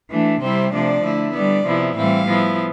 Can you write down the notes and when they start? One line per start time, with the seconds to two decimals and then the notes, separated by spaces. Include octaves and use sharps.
0.11 E3 A3 D4
0.41 C3 G3 C4 E4 C5
0.72 C3 F3 A3 D4 D5
1.04 D3 A3 E4
1.34 D3 G3 B3 D5
1.66 C3 F3 B3 E4
1.97 A2 E3 G3 C4 E4 F5
2.28 F3 B3 E4